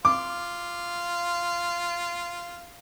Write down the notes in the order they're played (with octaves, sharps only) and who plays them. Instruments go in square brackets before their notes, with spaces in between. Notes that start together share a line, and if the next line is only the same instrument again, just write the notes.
[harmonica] F4 [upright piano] D6